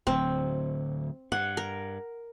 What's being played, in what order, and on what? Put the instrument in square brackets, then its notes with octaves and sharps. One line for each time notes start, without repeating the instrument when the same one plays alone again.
[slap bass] D1 D2 F#3 [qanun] C4
[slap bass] G2 [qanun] F#5
[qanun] A#4